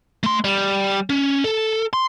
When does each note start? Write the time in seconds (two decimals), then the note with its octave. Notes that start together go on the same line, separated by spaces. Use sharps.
0.23 A3 C6
0.44 G3
1.10 C#4
1.44 A4
1.93 C6